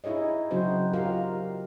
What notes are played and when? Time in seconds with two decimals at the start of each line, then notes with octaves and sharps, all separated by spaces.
0.04 D#4 E4 G#4 C#5 D#5
0.51 C#3 F#3 C4 D#4 F#4 C5
0.93 D#4 F4 G4 A#4 F5